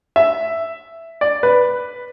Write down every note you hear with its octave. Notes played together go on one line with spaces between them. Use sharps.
E5
D5
B4